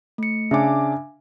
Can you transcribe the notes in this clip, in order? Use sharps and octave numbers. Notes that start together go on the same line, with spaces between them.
A3 C#7
C#3 D4 E5 G#5 D6